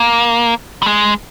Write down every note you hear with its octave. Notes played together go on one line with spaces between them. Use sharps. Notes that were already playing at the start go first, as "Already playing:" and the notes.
Already playing: A#3
G3
G#3